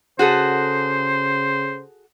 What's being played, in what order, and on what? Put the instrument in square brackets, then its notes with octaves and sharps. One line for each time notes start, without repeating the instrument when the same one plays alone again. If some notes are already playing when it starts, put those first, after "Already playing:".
[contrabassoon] C#3 [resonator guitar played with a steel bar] F#4 G#4 A4 [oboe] C5